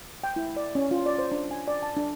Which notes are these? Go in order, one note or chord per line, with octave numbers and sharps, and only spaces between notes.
G5
E4
D5
C#4
F4
D5
C5
D4
G#5
D5
A5
D4